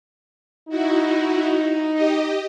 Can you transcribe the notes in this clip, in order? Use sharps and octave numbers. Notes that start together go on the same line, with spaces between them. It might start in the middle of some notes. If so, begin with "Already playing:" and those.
D#4 E4 F#4
G4 D#5